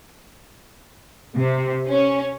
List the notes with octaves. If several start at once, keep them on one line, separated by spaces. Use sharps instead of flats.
C3
C#4